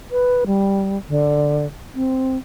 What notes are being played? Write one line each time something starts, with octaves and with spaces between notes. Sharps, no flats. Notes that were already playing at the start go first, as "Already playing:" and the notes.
B4
G3
D3
C4